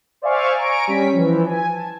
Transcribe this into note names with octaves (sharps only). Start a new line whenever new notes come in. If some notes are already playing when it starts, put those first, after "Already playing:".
C5 D5 E5 F5 G#5 C#6
G#5 A#5 C#6 D7
G3 C#4 B6
E3 F3
G#5
A5